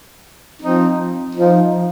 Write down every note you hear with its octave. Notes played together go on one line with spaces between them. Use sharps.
F3 C4 D#4
F3 D#4